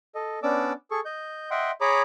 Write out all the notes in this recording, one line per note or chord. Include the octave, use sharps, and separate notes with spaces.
A4 D#5
B3 C#4 D4 D5 D6 E6
G#4 A4 C#6
D#5 G6
D#5 E5 F#5 G5 C6
G#4 C#5 A#5 B5 D6 D#6